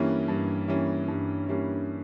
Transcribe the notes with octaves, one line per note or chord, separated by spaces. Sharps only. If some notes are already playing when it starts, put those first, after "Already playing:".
Already playing: G2 E3 G3 A#3 C#4
G2
E3 G3 A#3 C#4
G2
E3 G3 A#3 C#4